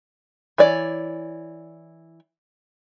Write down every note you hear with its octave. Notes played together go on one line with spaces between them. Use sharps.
E3 C#5 D5